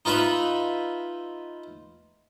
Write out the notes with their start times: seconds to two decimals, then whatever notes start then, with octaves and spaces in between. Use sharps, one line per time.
0.05 D#4 F4 B4 E5 B5